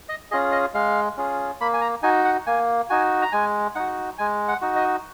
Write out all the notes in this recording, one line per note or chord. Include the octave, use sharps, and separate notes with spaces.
D#5
C#4 F4 G#4 D#5
D#5
G#3 F5
C#4 F4 G#4
A#3 B5
G#5
A#5
D#4 F#4 G#5
F#5
A#3 G#5
D#4 F#4 G#5
A#5
G#3 G#5
D#4 F#4 F#5
G#3 G#5
F#5
D#4 F#4
D#5